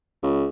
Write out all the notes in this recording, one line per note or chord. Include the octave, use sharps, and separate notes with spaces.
C#2